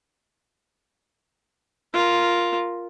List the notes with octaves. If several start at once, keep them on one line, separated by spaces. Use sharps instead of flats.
F4 A#4